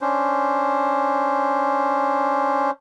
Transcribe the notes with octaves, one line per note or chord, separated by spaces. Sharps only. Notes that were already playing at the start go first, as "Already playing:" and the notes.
C#4 D4 C5